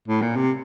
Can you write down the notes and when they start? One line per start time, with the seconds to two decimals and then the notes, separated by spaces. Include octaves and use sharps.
0.08 A2
0.22 A#2
0.37 C3